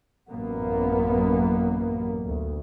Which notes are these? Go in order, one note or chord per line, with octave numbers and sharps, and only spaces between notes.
A1 F#2 A#3 B3
D2